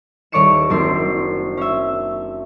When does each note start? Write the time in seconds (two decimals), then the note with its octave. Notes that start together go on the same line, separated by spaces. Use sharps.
0.32 D#1 C#5 D5 C#6 C#7 E7
0.70 F#1 C4 D4 C6
1.57 C#4 E5